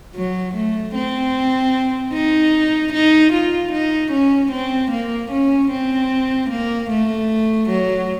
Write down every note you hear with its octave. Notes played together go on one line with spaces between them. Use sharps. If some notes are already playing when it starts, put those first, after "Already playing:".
F#3
A3
C4
D#4
D#4
F4
D#4
C#4
C4
A#3
C#4
C4
A#3
A3
F#3